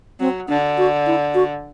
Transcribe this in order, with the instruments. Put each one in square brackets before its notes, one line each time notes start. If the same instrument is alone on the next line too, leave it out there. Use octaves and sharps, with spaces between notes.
[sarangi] F#3 [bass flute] C4
[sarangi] D3 [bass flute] D4
[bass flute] F#4
E4
F#4